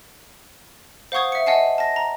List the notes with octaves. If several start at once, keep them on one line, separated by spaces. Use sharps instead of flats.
C5 F5 F#5 C#6 D#6 G#6
E5 C#7
D#5 E5 F#5 G#5 A5 C7
A5 A#6
A#5